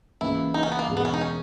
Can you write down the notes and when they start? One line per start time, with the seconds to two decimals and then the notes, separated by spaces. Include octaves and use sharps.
0.21 C#2 C#3 E3 A#3 E4
0.54 D#4
0.63 C#4
0.72 B3
0.79 A#3
0.87 E1 E2 B2 G#3
0.97 B3
1.05 C#4
1.14 D#4
1.21 C#4